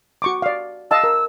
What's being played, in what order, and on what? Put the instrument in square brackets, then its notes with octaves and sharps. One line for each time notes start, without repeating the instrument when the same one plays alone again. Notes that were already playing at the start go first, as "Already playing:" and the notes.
[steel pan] F#4 C#6 D6
D5 F5
[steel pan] D#5 F5 A5 [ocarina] E6
[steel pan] A#4